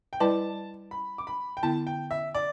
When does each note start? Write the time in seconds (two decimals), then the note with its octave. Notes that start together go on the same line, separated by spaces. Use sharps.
0.13 G5
0.20 G3 E4 B4 D5 A5
0.91 B5
1.18 D6
1.27 B5
1.57 G5
1.63 D3 B3 E4 A5
1.87 G5
2.11 E5
2.35 D5